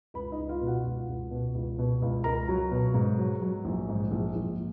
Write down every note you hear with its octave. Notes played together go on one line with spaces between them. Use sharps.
C#2 B4 B5
D#4 D#5
C#2
F4 F5
B2
F#4 F#5
C#2
C#2
B2
C#2
B2
C#2
C#2 A#4 A#5
F#3
B2
G#2
F#3
F#3
A#1
G#2
A#1
A#1